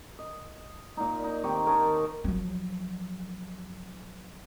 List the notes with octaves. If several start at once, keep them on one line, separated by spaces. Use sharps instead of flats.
D#5
A#2 D#4
D#4
D#3 C4 G4 C#6
A#4 C#5 D#5 A5
F3 F#3